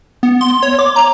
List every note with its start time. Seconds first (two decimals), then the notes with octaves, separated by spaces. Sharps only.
0.23 B3
0.41 C6
0.63 C#5
0.79 D6
0.96 A#5